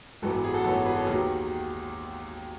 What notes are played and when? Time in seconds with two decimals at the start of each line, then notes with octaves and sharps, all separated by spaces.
0.22 G#1 F#2 E3 B3 F#4 A4
0.44 G#4
0.54 F#4 A4
0.65 G#1 F#2 E3 B3 A4 C#5
0.86 G#4 B4
0.96 A4 C#5
1.07 D#2 D#3 F#3 G#4